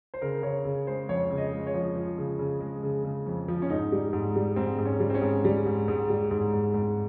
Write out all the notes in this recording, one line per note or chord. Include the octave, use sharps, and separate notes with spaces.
C5
C#3 A#4
C#3 C#5
C#3
G#3 C5
F2 C#5
C#3
D#5
G#3
C#5
F3
F3
C#3
C#3
G#3
C#3
C#3
F2
F3
C#4
G#2 D#4
G3
G#2
G3
G#2 C4
G#2
C#4
G3
C4
C#4
G#2
G3
G#2
G#2
G3
G#2
G#2
G#2